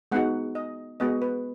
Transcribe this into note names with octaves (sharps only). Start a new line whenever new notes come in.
G#3 B3 D#4 F#4 F#5
D#5
G#3 B3 F#4 D#5
B4